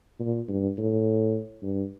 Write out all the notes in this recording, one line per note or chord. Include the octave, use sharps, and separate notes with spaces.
A#2
G2
A2
G2